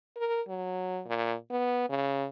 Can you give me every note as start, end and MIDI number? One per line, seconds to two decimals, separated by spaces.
0.17 0.41 70
0.48 1.00 54
1.06 1.34 46
1.51 1.88 59
1.90 2.26 49